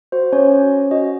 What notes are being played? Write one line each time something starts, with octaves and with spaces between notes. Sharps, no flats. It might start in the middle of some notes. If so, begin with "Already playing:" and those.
F#4 C5
C#4 C#5
C#4
C#4
F#4 D#5